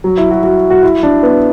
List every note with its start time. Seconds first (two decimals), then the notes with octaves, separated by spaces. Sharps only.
0.04 F#3
0.18 E4
0.31 F#4
0.44 F#4
0.70 F#4
0.83 E4
1.03 D4
1.23 B3